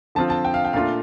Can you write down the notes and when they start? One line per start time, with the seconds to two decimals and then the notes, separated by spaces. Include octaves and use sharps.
0.15 D3 F3 C4 F4 A5
0.30 A5
0.45 G5
0.54 F5
0.65 G5
0.73 A#2 A3 D4 F4 F5